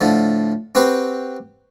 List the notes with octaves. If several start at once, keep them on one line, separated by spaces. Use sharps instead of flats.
A2 D3 F3
C4 F#4 G4 B4 C5